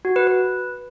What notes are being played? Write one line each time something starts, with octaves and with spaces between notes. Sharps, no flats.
F#4
B4
B4